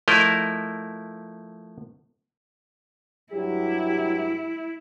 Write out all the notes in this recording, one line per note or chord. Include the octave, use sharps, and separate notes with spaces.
F3 A3 E4 A#4 D#5
G2 F#3 E4 G4